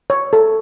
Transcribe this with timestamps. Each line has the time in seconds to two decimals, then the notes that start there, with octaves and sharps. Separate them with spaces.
0.10 C#5
0.33 A4